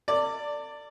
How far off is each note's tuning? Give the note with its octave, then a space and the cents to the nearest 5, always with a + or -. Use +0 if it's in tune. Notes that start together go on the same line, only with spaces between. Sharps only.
A4 +45 D5 +0